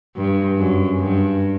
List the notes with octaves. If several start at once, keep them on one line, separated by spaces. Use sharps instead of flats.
G2
F#2
G2